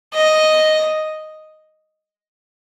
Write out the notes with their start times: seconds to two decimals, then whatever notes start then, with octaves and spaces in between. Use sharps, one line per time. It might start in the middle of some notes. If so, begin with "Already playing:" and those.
0.14 D#5